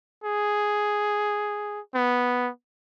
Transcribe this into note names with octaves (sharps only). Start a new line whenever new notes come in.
G#4
B3